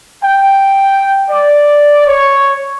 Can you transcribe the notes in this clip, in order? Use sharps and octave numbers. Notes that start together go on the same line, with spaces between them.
G5
D5
C#5